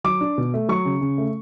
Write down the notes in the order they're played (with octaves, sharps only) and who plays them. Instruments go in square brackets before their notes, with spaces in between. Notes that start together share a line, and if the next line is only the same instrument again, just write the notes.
[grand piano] F#3 D6
D4
B2
A3
F#3 C#6
C#3
C#3
A3